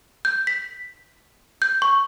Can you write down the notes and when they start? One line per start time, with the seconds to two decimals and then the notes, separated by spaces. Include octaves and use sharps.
0.25 G6
0.47 B6
1.62 G6
1.82 C#6